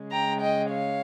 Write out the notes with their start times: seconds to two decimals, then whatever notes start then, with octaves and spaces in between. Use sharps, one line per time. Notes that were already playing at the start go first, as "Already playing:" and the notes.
Already playing: C#3 G#3
0.12 G5 A#5
0.41 D#5 G5
0.70 C#5 F5